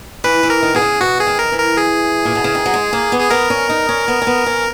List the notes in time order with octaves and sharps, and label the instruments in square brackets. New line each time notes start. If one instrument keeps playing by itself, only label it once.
[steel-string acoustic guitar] E3 [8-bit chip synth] B4
[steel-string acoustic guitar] E3
[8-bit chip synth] A#4
[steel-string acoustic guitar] D#3
[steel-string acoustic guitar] B2 [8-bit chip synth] G#4
[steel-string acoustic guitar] C#3
[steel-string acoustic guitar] B2 [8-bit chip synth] F#4
[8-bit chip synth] G#4
[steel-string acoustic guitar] D#3
[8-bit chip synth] A#4
[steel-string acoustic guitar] E3
[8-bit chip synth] A#4
G#4
[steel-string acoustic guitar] A#2
B2
C#3
D#3
F#3
G#3
A#3
B3
[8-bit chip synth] G#4
[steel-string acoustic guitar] B3 [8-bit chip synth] A#4
[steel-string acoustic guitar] C#4
D#4
C#4
B3
C#4
B3
C#4